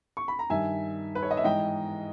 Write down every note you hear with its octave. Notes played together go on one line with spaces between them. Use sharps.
C#6
B5
A#5
G2 D#3 E5 G#5
B4
C#5
D#5
E5
G#2 E3 D#5 G5